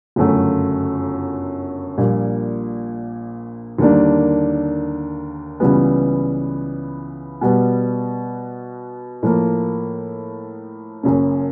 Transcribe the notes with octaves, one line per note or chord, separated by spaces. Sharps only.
G1 F#2 C#3 F#3 A3
A#1 A#2 G3
D#2 D3 G3 A#3 D4
C#2 C#3 E3 G3 B3
B2 G3 B3
A2 F3 A#3
F#1 F#2 C#3